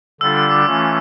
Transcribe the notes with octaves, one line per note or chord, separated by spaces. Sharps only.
D3 G3 D4 F4 A4 E6
E6
D6
E3 A3 C#4 F4